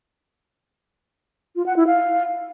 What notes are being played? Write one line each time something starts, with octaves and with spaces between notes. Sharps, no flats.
F4
F#5
E4
F5